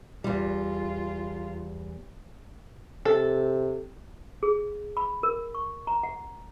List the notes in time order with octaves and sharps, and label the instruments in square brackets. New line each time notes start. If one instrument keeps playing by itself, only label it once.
[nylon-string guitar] E2 G3 [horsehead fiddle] F4
[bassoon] C3 [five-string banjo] A4
[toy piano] G#4
B5
A#4
C#6
A#5
F#5